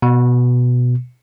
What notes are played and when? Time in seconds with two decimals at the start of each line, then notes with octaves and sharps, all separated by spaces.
0.02 B2